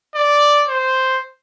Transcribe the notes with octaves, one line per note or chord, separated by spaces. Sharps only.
D5
C5